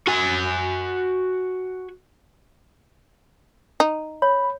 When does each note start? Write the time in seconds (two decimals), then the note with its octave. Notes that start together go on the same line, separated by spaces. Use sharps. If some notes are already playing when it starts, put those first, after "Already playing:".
0.07 F#4 G#5
3.80 D#4
4.22 C#5 B5